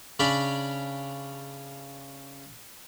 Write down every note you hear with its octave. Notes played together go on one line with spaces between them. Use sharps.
C#3 C#4 D4 D5 B5